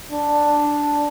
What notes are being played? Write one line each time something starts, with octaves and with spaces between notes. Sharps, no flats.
D4